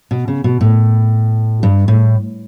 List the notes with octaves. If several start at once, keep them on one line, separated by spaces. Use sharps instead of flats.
B2
C#3
B2
A2
G2
A2